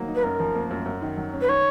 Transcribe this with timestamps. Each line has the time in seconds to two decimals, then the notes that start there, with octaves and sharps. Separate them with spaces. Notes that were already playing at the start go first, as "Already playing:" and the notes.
Already playing: D#3 F#3 A#3
0.08 D#4
0.15 B4
0.23 F#2 A#4
0.40 F3
0.55 A#3
0.71 F#2
0.86 F#2
1.02 D#3
1.17 F#3
1.33 C#4
1.41 B4
1.48 D#3 C#5